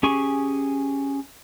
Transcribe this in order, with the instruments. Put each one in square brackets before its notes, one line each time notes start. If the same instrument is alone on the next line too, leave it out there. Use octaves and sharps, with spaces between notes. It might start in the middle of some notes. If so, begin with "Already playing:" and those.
[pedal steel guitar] C#4 G4 G#4 G#5 C#6